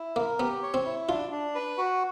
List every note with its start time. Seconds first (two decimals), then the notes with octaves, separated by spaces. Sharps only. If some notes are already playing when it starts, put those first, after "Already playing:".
Already playing: E4
0.16 A#3 A#4
0.40 B3 G4
0.63 C#5
0.74 C4
0.86 E4
1.08 D4 F4
1.32 D4
1.55 B4
1.78 F#4